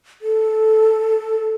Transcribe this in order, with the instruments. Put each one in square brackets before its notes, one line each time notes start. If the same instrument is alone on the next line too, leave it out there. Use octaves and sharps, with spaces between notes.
[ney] A4